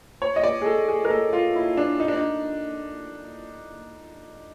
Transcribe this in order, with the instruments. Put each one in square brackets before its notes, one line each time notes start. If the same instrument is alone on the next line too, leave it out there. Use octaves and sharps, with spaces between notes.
[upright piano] C#5
D#5
D5
G#4
A4
G#4
A#4
A4
F4
E4
D4
D#4
D4
D#4